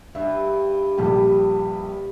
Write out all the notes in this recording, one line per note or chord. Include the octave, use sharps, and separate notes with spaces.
G2 E5
A#1 G3 G4